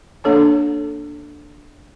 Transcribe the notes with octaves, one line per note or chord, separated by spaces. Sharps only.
A#3 D4 A4 C#5 A5